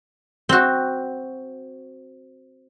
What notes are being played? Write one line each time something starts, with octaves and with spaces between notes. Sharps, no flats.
C4 F#4